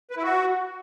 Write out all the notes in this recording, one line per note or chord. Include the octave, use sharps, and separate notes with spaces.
B4
E4
F#4